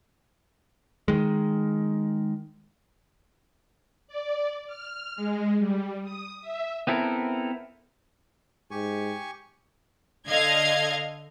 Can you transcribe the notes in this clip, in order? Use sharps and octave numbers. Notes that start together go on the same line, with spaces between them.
D#3 G#3
D5
F6
G#3
G3
D#6
E5
B3 C4 E4 A4 A#4
G#2 G4 G#5 C#6
D3 D#5 F5 G#6